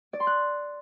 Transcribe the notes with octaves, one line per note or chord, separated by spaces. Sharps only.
D5
C6
F#6